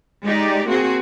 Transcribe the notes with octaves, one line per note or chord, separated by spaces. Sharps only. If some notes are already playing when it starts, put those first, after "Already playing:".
G#3 D#4 G4 D5
A#3 C4 F#4 G#4